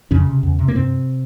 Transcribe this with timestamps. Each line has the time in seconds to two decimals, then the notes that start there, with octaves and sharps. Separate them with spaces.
0.11 F2 C#3 C#4
0.27 C3
0.43 E2
0.59 C3
0.68 A#3
0.75 G2 C3 C4